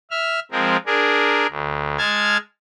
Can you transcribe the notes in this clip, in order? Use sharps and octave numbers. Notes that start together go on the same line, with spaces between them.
E5 F6
F3 G#3 C4 A#4
D4 G#4 A#4
D2
G#3 A5 F6 G#6